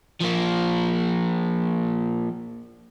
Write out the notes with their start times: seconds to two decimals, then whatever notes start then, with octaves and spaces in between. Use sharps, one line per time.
0.20 F3 A#3